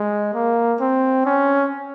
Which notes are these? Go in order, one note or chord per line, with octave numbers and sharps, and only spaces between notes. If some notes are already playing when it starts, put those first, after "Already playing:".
Already playing: G#3
A#3
C4
C#4